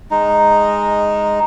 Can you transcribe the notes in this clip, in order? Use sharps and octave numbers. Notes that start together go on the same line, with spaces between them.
G#3 D#4